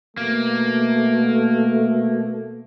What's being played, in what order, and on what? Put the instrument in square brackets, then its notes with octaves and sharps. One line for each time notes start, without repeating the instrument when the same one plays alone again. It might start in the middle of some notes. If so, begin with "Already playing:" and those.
[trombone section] B2 A3 [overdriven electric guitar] A#3